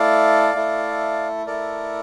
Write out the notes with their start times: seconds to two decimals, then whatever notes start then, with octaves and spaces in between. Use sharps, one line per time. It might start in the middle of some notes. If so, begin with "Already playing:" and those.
Already playing: A3 E4 A4 D5 F5
0.54 A3 E4 A4
1.46 A3 E4 A4 A#4 D5